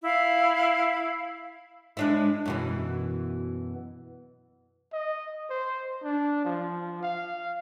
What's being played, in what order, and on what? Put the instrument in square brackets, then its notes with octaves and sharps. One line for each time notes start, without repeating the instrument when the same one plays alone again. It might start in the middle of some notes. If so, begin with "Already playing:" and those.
[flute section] E4 F5
[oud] G#3 D4 E4
F#2 B2 E3
[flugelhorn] D#5
C5
D4
F3
F5